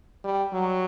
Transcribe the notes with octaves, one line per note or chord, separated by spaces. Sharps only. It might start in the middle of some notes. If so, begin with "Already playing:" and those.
G3
F#3